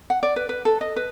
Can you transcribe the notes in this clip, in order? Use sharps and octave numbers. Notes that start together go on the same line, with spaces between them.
F#5
D5
B4
B4
A4
D#5
B4